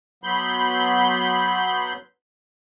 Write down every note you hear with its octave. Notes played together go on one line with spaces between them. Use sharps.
F#3 B3 B5 C6 G6